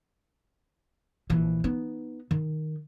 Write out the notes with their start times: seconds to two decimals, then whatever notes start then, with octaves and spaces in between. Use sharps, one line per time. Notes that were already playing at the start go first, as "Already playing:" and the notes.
1.30 A#1 E3
1.64 B3 D#4
2.31 D#3